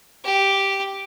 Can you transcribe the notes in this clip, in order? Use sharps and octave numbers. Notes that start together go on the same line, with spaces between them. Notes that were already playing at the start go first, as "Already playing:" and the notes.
G4